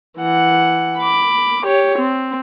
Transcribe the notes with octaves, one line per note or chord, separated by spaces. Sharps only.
E3 F#5
B5 D6
G4 C#5
C4